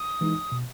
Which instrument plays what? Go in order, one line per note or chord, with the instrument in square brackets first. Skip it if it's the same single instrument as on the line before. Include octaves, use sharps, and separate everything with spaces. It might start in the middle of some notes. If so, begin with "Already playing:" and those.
Already playing: [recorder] D#6
[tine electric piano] E3 G#3 D#4
B2